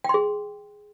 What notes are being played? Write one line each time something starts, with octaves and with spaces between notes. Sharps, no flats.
G#4 G5 C6